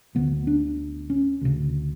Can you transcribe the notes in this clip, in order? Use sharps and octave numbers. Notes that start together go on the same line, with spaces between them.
D2 D3 B3
D4
C#4
D2 C#3